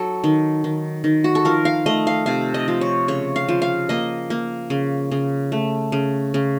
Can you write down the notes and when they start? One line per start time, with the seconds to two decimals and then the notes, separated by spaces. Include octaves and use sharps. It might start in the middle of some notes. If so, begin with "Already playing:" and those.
Already playing: F#3 A4
0.24 D#3
0.64 D#3
1.04 D#3
1.24 F#4
1.35 A4
1.45 F3 A#4
1.65 F5
1.86 A3 D#5
2.07 F5
2.26 C3 F5
2.54 D#5
2.68 F3
2.81 C#5
3.08 C#3 C#5
3.36 F5
3.48 F3
3.62 F5
3.89 A#3 D#5
4.30 A#3
4.70 C#3
5.12 C#3
5.52 A3
5.92 C#3
6.34 C#3